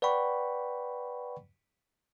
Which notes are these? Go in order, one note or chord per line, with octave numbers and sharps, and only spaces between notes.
B4 D5 F#5 G5 B5 C#6